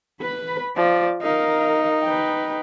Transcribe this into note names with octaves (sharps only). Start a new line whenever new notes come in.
B4 B5
F3 D5
D#4 A#4 F5
B4 G5